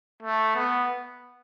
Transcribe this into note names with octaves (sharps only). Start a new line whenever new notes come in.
A3
B3